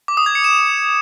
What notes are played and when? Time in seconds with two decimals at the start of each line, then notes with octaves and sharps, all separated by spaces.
0.08 D6
0.17 D#6
0.26 G#6
0.35 C#7
0.44 E7